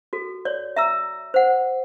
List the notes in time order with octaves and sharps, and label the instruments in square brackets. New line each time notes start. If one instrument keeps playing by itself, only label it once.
[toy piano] F#4 A4
C#5 D5
E5 A#5 E6
C5 F#5